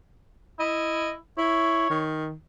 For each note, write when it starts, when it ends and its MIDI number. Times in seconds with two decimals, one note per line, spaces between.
0.60 1.16 64
0.60 1.13 75
1.38 1.90 64
1.38 2.03 73
1.90 2.34 51